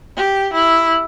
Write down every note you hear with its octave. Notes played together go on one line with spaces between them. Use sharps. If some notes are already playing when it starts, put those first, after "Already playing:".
G4
E4